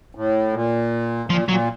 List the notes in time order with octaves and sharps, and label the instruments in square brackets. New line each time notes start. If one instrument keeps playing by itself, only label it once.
[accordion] A2
A#2
[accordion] A#2 [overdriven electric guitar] F3
[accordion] A#2 [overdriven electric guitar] F#3